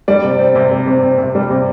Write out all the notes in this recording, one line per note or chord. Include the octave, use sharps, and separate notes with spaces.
G3 D5
C3
C4
C3
G3
C3
C4
C3
G3
C3